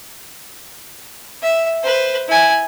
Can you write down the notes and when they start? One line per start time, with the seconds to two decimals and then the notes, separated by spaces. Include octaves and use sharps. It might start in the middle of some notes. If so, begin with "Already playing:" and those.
1.42 E5
1.83 B4 C5
2.29 E4 G#5